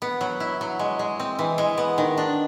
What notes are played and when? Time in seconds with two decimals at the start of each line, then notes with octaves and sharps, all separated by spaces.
0.02 B3
0.21 F#3
0.40 E4
0.61 F#3
0.79 G#3
0.99 G#3
1.20 C4
1.39 E3
1.58 G#3
1.78 B3
1.98 D#3
2.18 D4